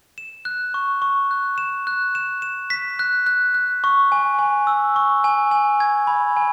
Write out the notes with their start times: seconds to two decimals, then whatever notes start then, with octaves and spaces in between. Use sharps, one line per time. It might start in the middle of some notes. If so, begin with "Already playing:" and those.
0.18 E7
0.45 F#6
0.74 C#6
1.02 C#6
1.31 F#6
1.58 E7
1.87 F#6
2.15 E7
2.42 E7
2.70 B6
2.99 F#6
3.26 F#6
3.54 F#6
3.84 C#6
4.12 G#5
4.39 G#5
4.67 E6
4.96 C#6
5.24 G#5
5.51 G#5
5.80 G#6
6.07 B5
6.37 G#5